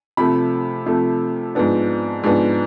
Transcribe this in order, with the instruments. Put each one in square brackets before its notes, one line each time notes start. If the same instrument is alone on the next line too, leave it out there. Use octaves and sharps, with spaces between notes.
[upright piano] C3 F3 A3 B5
C3 F3 A3
G#2 F3 B3 D4
G#2 F3 B3 D4